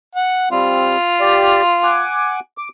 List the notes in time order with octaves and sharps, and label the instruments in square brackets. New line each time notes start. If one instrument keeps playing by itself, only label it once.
[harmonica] F#5
[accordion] G3 C4 [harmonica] F4
[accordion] G4 D5
F#5 G#5 D6
D6